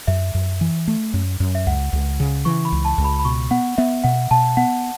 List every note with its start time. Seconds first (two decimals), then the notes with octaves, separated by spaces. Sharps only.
0.07 F#2 E5
0.35 F#2
0.61 E3
0.88 A3
1.14 F#2
1.40 F#2
1.55 E5
1.67 C#2 F#5
1.93 C#2
2.20 C#3
2.45 E3 C#6
2.65 B5
2.72 C#2
2.85 A5
2.98 C#2
3.04 B5
3.19 B5
3.25 B2 C#6
3.51 B3 F#5
3.78 B3 E5
4.04 B2 F#5
4.31 B2 A5
4.57 B3 F#5